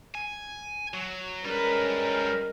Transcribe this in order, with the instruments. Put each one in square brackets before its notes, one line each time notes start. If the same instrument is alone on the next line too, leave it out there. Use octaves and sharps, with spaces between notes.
[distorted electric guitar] G#5
F#3
[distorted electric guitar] G3 B4 [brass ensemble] G#3 C#4 A#4